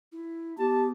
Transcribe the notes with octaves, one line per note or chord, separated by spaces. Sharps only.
E4
B3 G4 A5